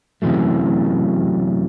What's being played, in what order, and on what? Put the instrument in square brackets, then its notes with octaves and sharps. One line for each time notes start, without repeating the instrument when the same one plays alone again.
[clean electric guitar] F#2 C3 E3 F#3 A3